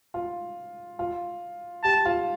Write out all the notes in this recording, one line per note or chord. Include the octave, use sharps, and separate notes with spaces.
F4
F4
G4 A5
F4